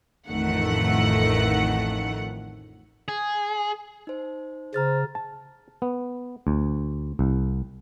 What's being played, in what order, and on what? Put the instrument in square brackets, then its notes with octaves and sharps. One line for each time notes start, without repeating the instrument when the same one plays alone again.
[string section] A1 F2 A2 D#3 A3 F#5
[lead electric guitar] G#4
[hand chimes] D#4 C5
[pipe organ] C#3 [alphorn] C5 [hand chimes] A#5 F6 A6
[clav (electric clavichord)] A5
B3
D2
C2